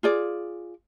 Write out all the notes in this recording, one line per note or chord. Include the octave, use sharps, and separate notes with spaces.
F4 G#4 D5